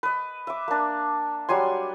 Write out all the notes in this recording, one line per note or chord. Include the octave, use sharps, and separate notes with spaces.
B4 D#5
E5 D6
A#3 D4
F#3 G3 G#5 C6